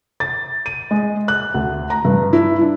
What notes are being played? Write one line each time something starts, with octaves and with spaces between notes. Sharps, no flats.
A6
D#7
G#3
F#6
D2
A#5
G2
E4
D4